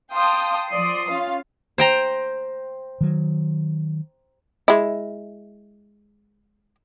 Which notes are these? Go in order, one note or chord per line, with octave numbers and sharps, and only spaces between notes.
F5 G5 A5 C6 D#6
F3 D5 C6 D#6 C7
C#4 F4 F5
C5 G5 A#5
D#3 F#3
G#3 E4